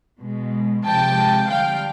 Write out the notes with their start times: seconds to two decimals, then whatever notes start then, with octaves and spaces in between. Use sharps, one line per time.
0.19 B2 G#3
0.84 C3 F3 G#3 G5 A5
1.48 D3 G3 F5 G5